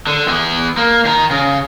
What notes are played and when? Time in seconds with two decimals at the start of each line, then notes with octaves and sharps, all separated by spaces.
0.07 D3
0.28 E3 B3
0.77 A#3
1.05 D#3 A#5
1.31 C#3